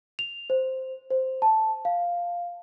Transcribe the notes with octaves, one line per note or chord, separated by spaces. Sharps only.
F7
C5
C5
A5
F5